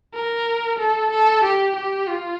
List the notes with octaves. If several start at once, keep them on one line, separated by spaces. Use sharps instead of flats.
A#4
A4
A4
G4
G4
F4